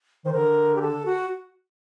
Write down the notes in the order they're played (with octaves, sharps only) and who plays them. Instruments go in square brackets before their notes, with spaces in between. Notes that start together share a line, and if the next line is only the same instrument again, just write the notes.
[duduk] D#3 [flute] C5
[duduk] D3 [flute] A#4
[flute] G4
A4
F#4